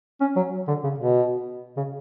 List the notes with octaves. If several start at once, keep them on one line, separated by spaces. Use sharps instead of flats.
C#4
F#3
D3
C#3
B2
C#3